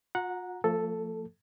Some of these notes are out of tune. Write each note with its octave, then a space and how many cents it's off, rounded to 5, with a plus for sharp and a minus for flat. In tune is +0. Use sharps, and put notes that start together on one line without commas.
F4 +45 F#5 -15 A#5 +0
F3 +0 A3 +45 A4 +0